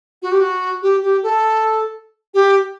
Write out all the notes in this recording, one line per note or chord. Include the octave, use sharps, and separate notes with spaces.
F#4
G4
F#4
G4
G4
A4
G4